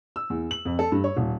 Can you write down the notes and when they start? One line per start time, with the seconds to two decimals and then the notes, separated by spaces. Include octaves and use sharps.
0.16 E6
0.30 E2
0.51 F#7
0.65 F2
0.79 A4
0.92 G2
1.04 C#5
1.17 D#1